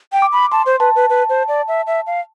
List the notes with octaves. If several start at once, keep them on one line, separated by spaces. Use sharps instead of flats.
G5
D6
B5
A5 C6
C5
B4 A5
B4
B4
C5
D5
E5
E5
F5